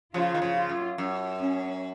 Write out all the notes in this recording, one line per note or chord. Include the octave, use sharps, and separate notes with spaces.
C#3 F3 F4
D#3
C#3 F3
F4
F#2
F#2
C#4